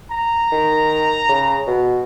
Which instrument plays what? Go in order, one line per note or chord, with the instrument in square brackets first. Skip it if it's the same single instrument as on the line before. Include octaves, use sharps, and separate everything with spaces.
[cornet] A#5
[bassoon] D#3
C#3
B2